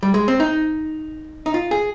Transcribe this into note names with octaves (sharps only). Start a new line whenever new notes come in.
G3
G#3
C4
D#4
D#4
F4
G#4